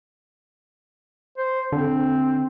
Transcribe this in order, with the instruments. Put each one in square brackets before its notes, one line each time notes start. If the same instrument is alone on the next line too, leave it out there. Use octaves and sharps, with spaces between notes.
[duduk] C5
[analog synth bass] D3 [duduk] C4